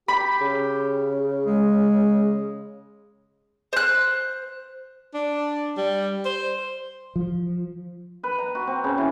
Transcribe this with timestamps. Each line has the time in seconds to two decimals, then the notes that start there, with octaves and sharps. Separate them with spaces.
0.08 G4 B5
0.41 C#3
1.46 G#3
3.73 C5 F#6
5.14 D4
5.77 G3
6.25 C5
7.16 F3
8.23 B4
8.38 A#5
8.55 F#4
8.67 C4
8.84 C#3
8.98 E3